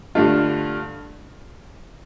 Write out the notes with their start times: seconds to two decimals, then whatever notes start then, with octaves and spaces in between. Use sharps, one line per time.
0.15 G2 D3 A3 D4 F4